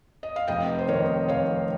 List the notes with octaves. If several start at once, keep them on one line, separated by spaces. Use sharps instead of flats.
D#5
F5
F1 D#5 G5
C5
F2 D#3 A#4 C#5
F1 C#5 F5